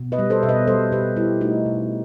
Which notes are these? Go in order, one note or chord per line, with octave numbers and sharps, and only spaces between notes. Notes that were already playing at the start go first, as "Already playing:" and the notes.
Already playing: B2
B4 D#5
G3
A4 C5
B2 E5
B4 D#5
G3 A4 C5
B2 G4 B4
G3 E4 G4
A3 D#4 F#4
B2